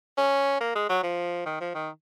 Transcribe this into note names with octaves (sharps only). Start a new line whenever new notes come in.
C#4
A#3
G#3
F#3
F3
D#3
F3
D#3